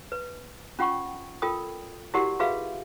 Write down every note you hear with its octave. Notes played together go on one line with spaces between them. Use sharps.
B4
C#4 F4 F#5 G5 C#6
F4 A4 A#4 G5 D#6
E4 F#4 G4 A#4 D5 F#5
F4 F#4 G#4 B4 E5 F5